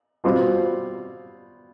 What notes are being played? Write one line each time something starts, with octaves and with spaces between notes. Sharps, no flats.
B2 G3 C4 F4